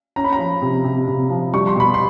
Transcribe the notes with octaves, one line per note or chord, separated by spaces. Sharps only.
C#4 A#5
B5
A#5
F3
C3
C3
C3
F3
G3 C#6
C6
B2 B5
C6